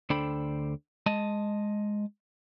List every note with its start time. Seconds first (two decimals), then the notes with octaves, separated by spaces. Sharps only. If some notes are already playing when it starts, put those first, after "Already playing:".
0.10 D2 D4 A4 C5 G5 B5
1.06 G#3 D#5 A5